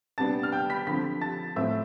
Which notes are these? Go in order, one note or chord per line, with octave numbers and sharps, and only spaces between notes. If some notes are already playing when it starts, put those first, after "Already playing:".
C3 G3 B3 D4 A5 A6
F6
G5 G6
B5 B6
D3 F3 C4 B5 B6
A5 A6
A2 F3 A3 C4 E5 E6